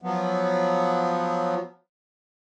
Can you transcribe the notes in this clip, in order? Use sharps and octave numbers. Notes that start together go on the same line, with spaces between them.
F3 F#3 B3